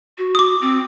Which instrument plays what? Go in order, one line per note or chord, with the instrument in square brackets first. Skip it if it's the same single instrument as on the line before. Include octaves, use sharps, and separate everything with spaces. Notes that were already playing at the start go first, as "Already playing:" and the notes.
[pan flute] F#4
[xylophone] D6 D#6
[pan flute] C4